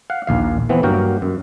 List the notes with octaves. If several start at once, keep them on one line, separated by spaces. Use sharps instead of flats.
F5 F#5
A#1 D#2 F5
E3 B3 C4
G2 F#3 A#3 F#4 A#4 G5
F#2